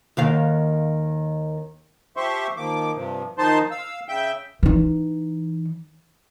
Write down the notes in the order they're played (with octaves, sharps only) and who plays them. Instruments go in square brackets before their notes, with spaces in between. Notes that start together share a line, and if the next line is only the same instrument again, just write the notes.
[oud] D#2 D#3 F5
[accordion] F3 G4 C5 E5 C6 C#6
D#3 F3 A#3 D6
G2 C3 F3
D#3 F3 D#4 C5 A5 C6
F5 E6
C#3 E5 G5 G6
[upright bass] E3 D#4